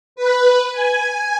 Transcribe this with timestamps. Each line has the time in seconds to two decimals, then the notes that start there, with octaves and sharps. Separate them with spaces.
0.16 B4
0.72 G#5